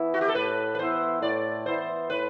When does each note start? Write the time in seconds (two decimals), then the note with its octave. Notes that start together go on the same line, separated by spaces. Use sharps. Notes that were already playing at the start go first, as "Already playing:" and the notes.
Already playing: E3 B3 E4
0.14 F#4
0.21 G4
0.28 A4
0.35 A2 B4
0.75 B4
0.79 E3 B3 E4 C5
1.22 A2 D5
1.66 E3 B3 E4 C5
2.10 A2 B4